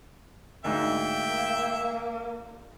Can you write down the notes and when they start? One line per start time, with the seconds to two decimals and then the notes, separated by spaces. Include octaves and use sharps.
0.64 D2 G#2 A#3 E5 G5